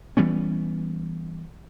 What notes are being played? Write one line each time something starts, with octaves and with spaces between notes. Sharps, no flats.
E3 G3 B3 C#4